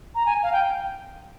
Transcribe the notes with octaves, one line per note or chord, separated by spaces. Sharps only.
A#5
G#5
F5
G5